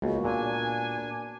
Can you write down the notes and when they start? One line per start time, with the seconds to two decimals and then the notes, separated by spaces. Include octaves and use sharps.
0.02 C#2 A#3 B3 F#4
0.25 A#2 D4 G#5